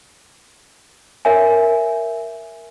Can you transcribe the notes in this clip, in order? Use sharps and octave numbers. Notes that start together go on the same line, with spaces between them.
A#4 C#5 E5 G#5